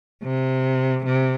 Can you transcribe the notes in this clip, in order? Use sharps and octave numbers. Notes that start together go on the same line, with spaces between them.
C3
C3